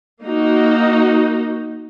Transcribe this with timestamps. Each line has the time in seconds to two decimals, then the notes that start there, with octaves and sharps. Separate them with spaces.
0.23 A#3 D#4 F#4